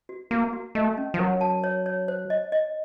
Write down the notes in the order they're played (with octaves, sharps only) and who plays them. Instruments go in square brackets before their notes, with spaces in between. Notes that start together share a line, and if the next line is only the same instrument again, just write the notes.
[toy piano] F#4
[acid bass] A#3 [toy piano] F#4
[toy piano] F#4
[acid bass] A3 [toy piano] D#5
[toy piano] C#4
[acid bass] F3
[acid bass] F#3 [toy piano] A#4
[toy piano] A5
C#5
C#5
C5
D#5
D#5